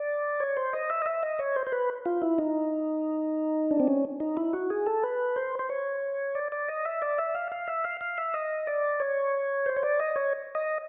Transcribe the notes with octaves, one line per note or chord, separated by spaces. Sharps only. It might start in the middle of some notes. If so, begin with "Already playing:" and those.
Already playing: D5
C#5
C5
D#5
E5
D#5
E5
D#5
C#5
C5
C5
B4
F4
E4
D#4
D4
C4
C#4
D#4
E4
F#4
G#4
A4
B4
C5
C5
C#5
D5
D5
D#5
E5
D5
E5
F5
F5
E5
F5
F5
E5
D#5
D5
C#5
C5
C#5
D5
D#5
C#5
D#5